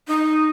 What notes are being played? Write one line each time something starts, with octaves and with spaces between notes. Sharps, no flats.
D#4